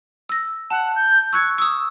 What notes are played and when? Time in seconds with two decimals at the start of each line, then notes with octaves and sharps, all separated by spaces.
0.29 E6 A#6
0.70 F#5 A5
0.95 G6
1.33 C#6 E6 F#6 G#6
1.58 C#6 D#6 E6